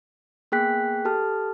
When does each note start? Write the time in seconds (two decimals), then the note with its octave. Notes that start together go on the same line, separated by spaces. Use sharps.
0.52 A#3 B3 G#4 G5 F#6 B6
1.05 G4 A4 A5 F6